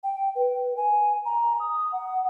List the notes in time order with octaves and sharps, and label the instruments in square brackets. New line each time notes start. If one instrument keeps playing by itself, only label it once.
[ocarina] G5
B4
G#5
A#5
D#6
F#5